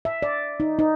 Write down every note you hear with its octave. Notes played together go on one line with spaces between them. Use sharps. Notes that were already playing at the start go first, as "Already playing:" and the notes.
E5
D5
D#4
D#4